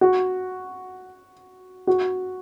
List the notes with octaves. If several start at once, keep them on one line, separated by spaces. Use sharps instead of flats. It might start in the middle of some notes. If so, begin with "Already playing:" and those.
F#4
F#4